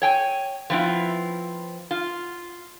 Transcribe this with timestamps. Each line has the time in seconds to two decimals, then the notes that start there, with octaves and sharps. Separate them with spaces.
0.02 C#5 G5 G#5
0.70 F3 B3 C4 E4 F4
1.91 F4